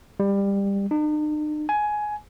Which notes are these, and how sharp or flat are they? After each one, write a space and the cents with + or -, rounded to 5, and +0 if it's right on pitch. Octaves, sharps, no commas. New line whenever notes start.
G3 +20
D#4 -45
G#5 +15